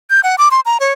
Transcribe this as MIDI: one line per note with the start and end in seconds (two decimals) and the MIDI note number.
0.10 0.20 91
0.24 0.36 78
0.38 0.49 86
0.51 0.60 84
0.66 0.78 82
0.80 0.93 73